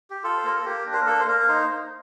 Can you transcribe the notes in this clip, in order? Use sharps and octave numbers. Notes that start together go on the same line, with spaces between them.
G4
F4 A4
C5
A#3 A#4
A4
A#3 G4
D4
C5
A#4
A#3 A4
C5
A#3 A#4
A#4
D#4 C5
D#4